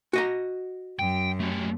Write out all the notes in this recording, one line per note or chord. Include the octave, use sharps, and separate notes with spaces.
F#4 D#5 A#5
F#2 G5
A3 G4